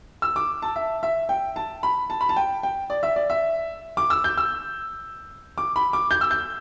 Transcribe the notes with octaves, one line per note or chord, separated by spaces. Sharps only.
E6
D6
A5
E5
E5
G5
A5
B5
A5
B5
A5
G5
G5
D5
E5
D5
E5
D6
E6
G6
E6
D6
B5
D6
G6
E6
G6